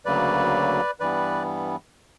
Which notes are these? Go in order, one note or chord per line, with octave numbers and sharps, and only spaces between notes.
D2 C#3 F#3 A#3 B4 D5
G2 E3 G3 B3 B4 D5